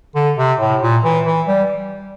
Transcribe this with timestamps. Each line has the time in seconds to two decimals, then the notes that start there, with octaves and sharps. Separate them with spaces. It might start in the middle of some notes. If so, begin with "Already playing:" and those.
0.15 D3
0.38 C3
0.60 A2
0.82 A#2
1.04 E3
1.26 E3
1.48 G3